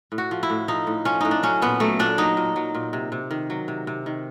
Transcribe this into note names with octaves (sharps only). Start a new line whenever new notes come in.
A2
F#4
F3
E4
A2
F3 D#4
A2
F3 C#4
A2 D#4
D4
F#3 C#4
A#2 B3
F#3 A3
A#2 D4
F#3 D#4
A#2
F#3
A#2
C3
C3
D#3
F#3
C3
C3
D#3